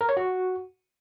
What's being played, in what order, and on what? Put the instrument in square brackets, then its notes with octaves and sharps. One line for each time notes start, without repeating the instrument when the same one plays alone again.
[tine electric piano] A#4
C#5
F#4